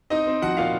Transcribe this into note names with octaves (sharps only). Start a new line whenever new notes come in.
C4 D#4 D#5
C4
F3 F#4 F#5
A#2 F4 F5